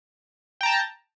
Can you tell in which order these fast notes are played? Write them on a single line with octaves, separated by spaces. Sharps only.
G5 A#5 A5